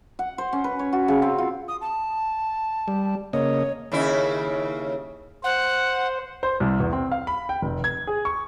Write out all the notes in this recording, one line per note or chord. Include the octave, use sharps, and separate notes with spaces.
F#5
C5
C#4
B4
C#5
F#4
C#3
C4
F4
D#6
A5
G3
C#3 A#3 C#5 D#5
D#2 C#3 E4
C5 F#5
C5
C2
E2
C4
F5
B5
G5
F1
G#6
G#4
C#6